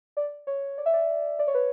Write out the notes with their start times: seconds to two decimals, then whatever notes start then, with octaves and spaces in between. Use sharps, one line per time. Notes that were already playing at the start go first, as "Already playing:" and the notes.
0.17 D5
0.47 C#5
0.78 D5
0.86 E5
0.93 D5
1.39 D5
1.47 C#5
1.54 B4